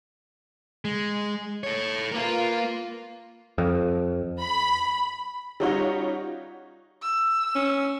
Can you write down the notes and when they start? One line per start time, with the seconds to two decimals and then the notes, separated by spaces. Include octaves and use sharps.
0.85 G#3
1.63 A4 C#5
2.12 A#3 F4 A#4 B4
3.58 F2
4.40 B5
5.60 G3 C#4 D#4 F4 F#4 C#5
7.02 E6
7.55 C#4